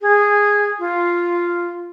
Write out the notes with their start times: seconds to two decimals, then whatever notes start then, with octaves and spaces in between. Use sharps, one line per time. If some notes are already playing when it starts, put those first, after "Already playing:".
0.01 G#4
0.79 F4